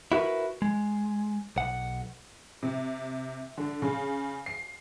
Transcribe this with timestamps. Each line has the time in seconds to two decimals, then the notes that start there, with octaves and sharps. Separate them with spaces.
0.12 E4 F#4 A#4 B4
0.62 G#3
1.56 B1 F#5
2.63 C3
3.58 D3
3.82 C#3
4.46 C7